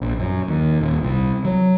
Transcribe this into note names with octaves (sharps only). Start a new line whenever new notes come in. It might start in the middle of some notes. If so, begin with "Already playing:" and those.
A#1
F#2
D#2
D#1
C2
F#3